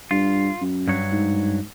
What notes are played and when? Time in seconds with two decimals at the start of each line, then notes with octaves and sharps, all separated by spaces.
0.11 G2 F4
0.61 F#2
0.88 G2 F#3 C#5
1.12 G#2